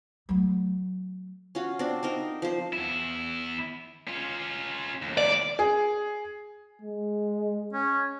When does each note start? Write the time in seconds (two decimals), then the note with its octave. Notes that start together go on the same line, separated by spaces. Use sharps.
0.29 F#3 A3
1.55 C#4 F4 F#4
1.79 C4 D4
2.03 C4 D#4 A#4
2.42 F3 C5
2.73 E2 E4
4.07 C#4 F4
5.02 D#2 A2
5.18 D5
5.59 G#4
6.81 G#3
7.73 C#4